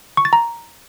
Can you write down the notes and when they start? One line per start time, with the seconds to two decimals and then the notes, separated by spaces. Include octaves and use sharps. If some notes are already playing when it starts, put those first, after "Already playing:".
0.17 C#6
0.25 A6
0.33 A#5